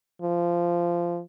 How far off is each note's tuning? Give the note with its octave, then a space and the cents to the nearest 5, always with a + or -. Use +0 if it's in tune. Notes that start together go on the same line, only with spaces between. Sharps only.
F3 -15